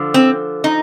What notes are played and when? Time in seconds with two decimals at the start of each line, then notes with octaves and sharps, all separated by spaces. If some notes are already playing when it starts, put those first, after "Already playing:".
Already playing: D3 F3
0.14 C4
0.64 D#4